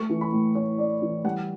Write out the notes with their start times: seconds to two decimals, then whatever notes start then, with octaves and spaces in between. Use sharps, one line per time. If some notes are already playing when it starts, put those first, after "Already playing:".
Already playing: A3 C#6
0.10 E3
0.21 B5
0.32 A2
0.55 A2 C#5
0.78 A3 D5
1.02 E3
1.24 G3 F#5